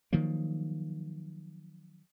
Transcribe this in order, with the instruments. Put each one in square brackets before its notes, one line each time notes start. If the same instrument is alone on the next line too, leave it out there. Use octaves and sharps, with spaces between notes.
[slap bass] D#3 F3 F#3 A#3